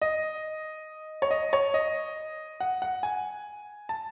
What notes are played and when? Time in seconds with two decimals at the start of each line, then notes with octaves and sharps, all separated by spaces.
0.02 D#5
1.22 C#5
1.31 D#5
1.53 C#5
1.74 D#5
2.60 F#5
2.82 F#5
3.03 G#5
3.89 A5